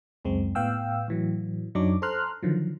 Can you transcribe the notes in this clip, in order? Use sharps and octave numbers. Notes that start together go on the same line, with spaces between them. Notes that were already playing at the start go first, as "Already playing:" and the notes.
C#2 F#2 G#3 C4
A2 B3 F5 G5 E6
A2 E3 F#3
F#2 F#3 D4 D#4 C#5 D6
A4 C5 A#5 C6 F6 F#6
D3 D#3 F3 F#3